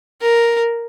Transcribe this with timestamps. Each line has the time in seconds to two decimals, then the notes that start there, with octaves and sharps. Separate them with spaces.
0.21 A#4